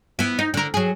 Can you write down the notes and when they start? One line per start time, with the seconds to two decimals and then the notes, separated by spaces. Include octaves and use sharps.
0.19 B3 E4
0.39 D#4
0.54 D3 A#4
0.74 F#3 G#4